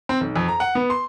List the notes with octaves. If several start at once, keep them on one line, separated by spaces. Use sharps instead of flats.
C4
B1
F2
A#5
F#5
B3
C6